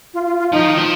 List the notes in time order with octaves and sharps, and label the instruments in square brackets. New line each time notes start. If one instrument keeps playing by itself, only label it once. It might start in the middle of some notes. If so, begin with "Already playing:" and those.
[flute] F4
F4
F4
[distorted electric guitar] F3 [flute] D#4
[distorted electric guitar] D#3
F3